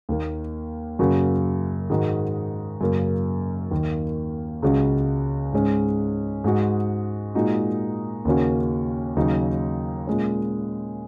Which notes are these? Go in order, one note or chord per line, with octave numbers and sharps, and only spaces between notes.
D#2 D#3 A#3
F#2 C#3 A#3 F#4
G#2 D#3 G#3 D#4 F#4
F#2 C#3 A#3
D#2 D#3 A#3
C#2 C#3 G#3 C#4 F#4
G#2 G#3 C#4
G#2 G#3 F#4
A#2 G#3 D#4 F#4
D#2 C#3 A#3 C#4 F#4
D#2 C#3 F#3 D#4
A#2 G#3 C#4